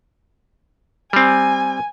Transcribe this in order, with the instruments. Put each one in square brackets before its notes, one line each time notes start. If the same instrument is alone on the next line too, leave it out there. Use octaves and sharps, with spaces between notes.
[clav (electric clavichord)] G3 C4 [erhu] G#5